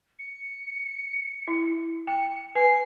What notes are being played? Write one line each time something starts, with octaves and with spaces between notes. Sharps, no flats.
C#7
E4
G5 C#7
B4 G#5 C7